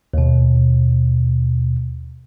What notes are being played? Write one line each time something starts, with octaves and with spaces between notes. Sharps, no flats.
D#2 B2